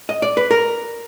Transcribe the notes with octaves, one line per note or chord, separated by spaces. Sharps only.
D#5
D5
B4
A#4